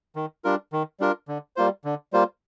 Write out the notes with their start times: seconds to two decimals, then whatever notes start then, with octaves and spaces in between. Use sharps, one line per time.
0.16 D#3
0.44 G3 D4 F4 A#4
0.73 D#3
1.00 G3 D4 F4 A#4
1.28 D3
1.56 G3 A#3 F4 C5
1.85 D3
2.13 G3 A#3 F4 C5